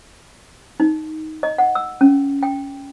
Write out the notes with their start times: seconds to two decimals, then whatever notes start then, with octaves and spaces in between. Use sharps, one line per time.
0.80 D#4
1.43 D#5
1.58 F#5
1.75 E6
2.01 C#4
2.43 G5